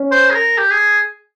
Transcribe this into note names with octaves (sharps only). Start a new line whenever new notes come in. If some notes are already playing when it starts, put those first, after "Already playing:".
Already playing: C#4
C5
G#4
A#4
G4
G#4